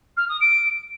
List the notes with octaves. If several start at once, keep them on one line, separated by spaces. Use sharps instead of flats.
F6
D#6
D7